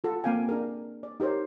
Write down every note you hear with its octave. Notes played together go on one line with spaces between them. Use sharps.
F4 A4 F#5
A#3 C4 F5 G5 G#5
D4 G#4 A#4
D5
D#4 G4 A#4 C5 C#5